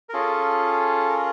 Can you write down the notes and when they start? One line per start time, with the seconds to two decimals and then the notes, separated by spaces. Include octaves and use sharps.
0.09 A#4
0.13 C#4 F4 G#4 A4
1.10 A#4